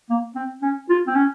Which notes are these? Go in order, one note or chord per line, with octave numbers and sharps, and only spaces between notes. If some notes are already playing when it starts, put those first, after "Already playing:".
A#3
C4
C#4
F4
C4
C#4